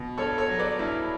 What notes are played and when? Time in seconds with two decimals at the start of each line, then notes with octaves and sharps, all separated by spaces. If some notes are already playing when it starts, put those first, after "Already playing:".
Already playing: B2
0.18 G2 A4 C#5
0.38 A4 C#5
0.49 F#3
0.58 B4 D5
0.79 G2 E4